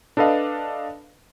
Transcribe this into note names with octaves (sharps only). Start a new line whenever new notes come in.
D4 A4 B4 D#5 F5